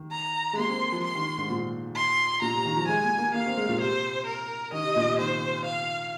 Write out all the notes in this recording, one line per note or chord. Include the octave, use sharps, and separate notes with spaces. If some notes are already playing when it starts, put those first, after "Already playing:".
Already playing: D#3
A#5
G#3
A#3 C6
C4
F3
C6
D#3
G#2
A#2
C6
A#2 A#5
C3
D#3
F3
G#3 G#5
A#3
A#3
A#3 F5
C4
G#3
A#2
C3 C5
A#4
D#3 D#5
C3
A#2
C3
D#3 C5
F5